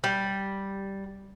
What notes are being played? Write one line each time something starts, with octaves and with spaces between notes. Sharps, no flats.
G3